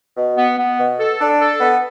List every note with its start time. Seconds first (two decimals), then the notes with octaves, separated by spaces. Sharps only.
0.17 B2
0.37 B3
0.57 B3
0.78 B2
0.99 A4
1.20 D4
1.40 A4
1.60 B3